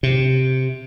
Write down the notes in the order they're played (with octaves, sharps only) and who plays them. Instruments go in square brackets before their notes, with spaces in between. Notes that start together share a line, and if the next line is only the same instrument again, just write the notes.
[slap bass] C3